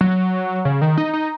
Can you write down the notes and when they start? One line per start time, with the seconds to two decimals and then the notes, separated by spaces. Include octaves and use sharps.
0.01 F#3
0.65 C#3
0.81 D#3
0.98 D#4
1.14 D#4